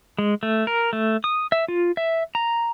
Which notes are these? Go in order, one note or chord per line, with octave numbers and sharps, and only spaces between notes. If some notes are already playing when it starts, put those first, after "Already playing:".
G#3
A3
A#4
A3
D#6
E5
F4
E5
A#5